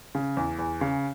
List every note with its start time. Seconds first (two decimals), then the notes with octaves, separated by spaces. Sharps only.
0.15 C#3
0.37 E2
0.59 E2
0.81 C#3